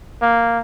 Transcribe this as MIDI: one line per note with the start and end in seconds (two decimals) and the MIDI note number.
0.22 0.60 58